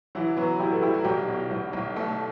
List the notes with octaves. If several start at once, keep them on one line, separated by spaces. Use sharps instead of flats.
E3 F#3 E4
F#3 B3 F#4
G3 E4 G4
A3 A4
G3 E4 G4
F#3 F#4
B1 G3 G4
B2
B1
B1
A3